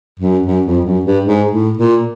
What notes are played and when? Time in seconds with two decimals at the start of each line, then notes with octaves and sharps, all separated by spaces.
0.20 F#2
0.46 F#2
0.66 F2
0.85 F#2
1.05 G2
1.25 G#2
1.51 A2
1.77 A#2